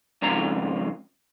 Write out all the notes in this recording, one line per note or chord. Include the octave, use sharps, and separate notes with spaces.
F2 G#2 C#3 F4 A#5